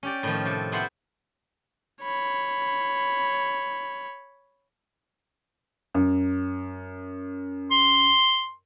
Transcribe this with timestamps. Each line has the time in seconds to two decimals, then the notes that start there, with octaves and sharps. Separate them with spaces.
0.03 C#4 G4 D5
0.23 A2 D#3 F3
0.45 C3 A4
0.72 B3 E4 F4 C5 E5 F#5
2.02 C#5 B5
5.94 F#2
7.71 C6